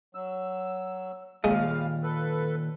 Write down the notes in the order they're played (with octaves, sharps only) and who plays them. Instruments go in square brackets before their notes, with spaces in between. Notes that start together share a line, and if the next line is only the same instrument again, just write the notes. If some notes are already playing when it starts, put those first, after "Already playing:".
[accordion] F#3 E6
[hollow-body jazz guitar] D#2 A#2 [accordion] G3 F5 [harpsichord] G#3
[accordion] A4 B4